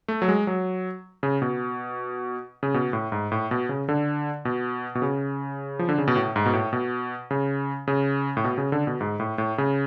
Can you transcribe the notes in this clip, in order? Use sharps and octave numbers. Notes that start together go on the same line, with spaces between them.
A3
F#3
G#3
F#3
C#3
B2
C#3
B2
A2
G#2
A2
B2
C#3
D3
B2
B2
C#3
F3
D3
C#3
B2
A2
G#2
B2
A2
B2
C#3
C#3
A2
B2
C#3
D3
B2
G#2
A2
A2
C#3